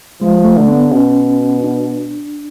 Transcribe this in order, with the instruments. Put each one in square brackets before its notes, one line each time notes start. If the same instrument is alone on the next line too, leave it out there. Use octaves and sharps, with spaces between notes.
[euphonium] F3 [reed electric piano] G#3
[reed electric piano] A3
[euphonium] D3
[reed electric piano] B3
[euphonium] B2 [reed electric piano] C#4
[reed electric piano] D4